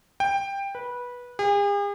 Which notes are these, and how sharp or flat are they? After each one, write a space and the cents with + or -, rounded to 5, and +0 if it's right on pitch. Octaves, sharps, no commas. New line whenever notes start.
G5 +15
B4 -15
G#4 -45